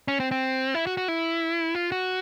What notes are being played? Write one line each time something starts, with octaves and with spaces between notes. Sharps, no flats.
C#4
C4
C4
E4
F#4
F#4
E4
F4
F#4